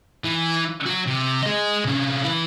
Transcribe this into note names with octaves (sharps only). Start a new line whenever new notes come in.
E3
F#3 F#4
C3
G#4 D#5
C3 C#4
E3 E4